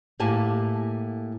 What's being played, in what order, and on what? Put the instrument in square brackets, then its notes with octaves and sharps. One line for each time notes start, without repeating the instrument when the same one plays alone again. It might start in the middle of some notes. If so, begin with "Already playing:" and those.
[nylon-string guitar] A2 A#3 G4 G#5 A5